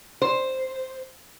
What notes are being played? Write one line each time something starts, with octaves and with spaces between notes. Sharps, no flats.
C5